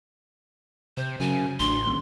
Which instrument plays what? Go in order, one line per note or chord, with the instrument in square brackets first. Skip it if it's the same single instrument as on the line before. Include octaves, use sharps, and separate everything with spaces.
[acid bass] C3 [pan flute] C5
[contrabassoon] F#2 [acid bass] C#3 [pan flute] G#5
[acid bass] A1 [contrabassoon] D2 [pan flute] C6
[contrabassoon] D#1